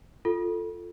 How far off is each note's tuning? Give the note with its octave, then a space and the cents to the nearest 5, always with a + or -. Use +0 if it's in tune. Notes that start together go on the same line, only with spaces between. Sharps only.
F4 +0 A4 +0